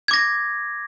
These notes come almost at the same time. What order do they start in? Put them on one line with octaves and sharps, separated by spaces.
G#6 D6 A#6